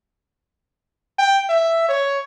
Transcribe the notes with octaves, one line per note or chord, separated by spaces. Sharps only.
G5
E5
C#5